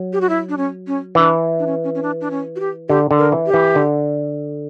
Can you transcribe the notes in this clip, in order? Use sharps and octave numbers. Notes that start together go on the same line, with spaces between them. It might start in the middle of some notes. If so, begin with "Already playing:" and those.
Already playing: F#3
G4
F#4
E4
D4
C#4
C#4
E3 D4
D4
C#4
C#4
C#4
D4
D4
C#4
F#4
G4
D3 G4
D3
A#4
E3
G4
E3
D3